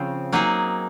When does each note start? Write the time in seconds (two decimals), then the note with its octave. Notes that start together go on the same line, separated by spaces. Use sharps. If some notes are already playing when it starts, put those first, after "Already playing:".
Already playing: C#3 F3 C4 F4
0.32 F#3 A#3 D#4 G#4